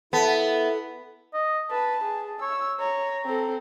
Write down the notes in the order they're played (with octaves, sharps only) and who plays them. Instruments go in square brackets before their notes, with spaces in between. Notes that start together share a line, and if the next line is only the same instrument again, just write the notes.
[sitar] B3 [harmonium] E4 [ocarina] A4 [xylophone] F#5 A5 B6
[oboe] D#5
[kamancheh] B4 [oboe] A5
[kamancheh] G#4
[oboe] C#5 [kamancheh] E6
[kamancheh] C#5 [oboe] A#5
[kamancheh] C4 A4